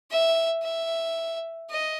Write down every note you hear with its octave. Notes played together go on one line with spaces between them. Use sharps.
E5
E5
D#5